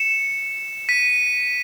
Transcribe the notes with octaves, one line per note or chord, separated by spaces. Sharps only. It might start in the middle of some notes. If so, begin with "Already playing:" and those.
Already playing: C#7 E7
B6 D#7